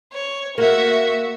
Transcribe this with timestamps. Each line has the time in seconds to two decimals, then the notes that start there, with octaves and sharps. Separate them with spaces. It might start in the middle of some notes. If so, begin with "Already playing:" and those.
0.13 C#5
0.58 A#3 F#4 E5